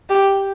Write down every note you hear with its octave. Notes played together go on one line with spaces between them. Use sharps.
G4